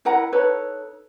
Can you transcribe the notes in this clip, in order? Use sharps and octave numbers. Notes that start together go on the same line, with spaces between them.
E4 A#4 F#5 A#5
D#4 A4 B4 C#5